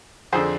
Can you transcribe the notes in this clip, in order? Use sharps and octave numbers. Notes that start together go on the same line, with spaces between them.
F2 D3 G#4 C5